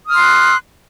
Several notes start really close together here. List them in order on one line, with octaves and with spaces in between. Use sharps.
D#6 F6 C6 F#6